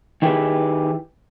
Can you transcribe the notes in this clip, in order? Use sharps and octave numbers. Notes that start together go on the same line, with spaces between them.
D#3 E4 G4 G#4 B4